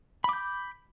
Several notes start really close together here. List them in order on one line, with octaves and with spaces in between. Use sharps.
B5 D6 G6